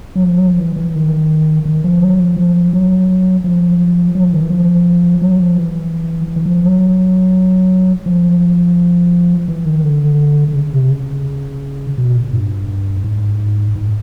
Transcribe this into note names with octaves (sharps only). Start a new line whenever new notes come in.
F#3
F3
F#3
F3
E3
E3
D#3
D#3
F3
F#3
F3
F3
F#3
F3
F#3
F3
D#3
E3
F3
F#3
F3
E3
E3
F3
F#3
F3
E3
D#3
D3
D3
C#3
C3
C#3
B2
A#2
G2
G#2
G#2